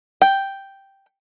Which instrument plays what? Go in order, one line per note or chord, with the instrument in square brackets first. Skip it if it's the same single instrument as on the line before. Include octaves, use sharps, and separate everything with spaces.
[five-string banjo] G5